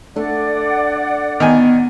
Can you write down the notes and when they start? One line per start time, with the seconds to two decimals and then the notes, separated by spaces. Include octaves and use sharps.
0.16 A3 D4 D5 F#5
1.40 D#3 B3 G#5